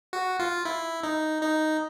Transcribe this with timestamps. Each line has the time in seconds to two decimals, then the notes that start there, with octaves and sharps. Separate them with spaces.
0.13 F#4
0.39 F4
0.65 E4
1.04 D#4
1.42 D#4